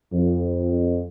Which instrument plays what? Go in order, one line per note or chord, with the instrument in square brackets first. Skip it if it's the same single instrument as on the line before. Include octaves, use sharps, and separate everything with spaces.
[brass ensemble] F2